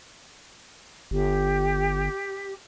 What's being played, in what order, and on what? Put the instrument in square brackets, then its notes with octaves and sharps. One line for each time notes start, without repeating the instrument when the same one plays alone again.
[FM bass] G1 [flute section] G4